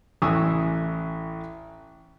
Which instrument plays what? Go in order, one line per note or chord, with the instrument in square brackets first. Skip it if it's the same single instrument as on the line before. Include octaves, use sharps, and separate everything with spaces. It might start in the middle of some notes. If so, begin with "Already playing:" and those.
[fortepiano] A1 E3 G#5 C#6 D#6 E6